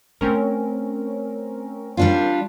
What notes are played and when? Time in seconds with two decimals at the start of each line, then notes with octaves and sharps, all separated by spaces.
0.21 A3 C4 C#4 A#4
1.97 G3 D4 F4